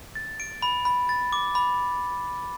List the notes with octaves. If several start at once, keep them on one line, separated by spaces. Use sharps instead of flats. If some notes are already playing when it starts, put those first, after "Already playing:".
A6
D7
B5
B5
A6
D6
B5